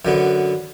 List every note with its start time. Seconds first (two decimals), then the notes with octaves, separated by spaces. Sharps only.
0.05 F#2 D3 B3